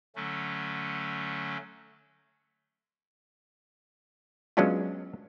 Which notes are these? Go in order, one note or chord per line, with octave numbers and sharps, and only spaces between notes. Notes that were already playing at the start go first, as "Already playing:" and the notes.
D3 F#3 A3 C#4
F#3 G#3 B3 C#4 D4 F4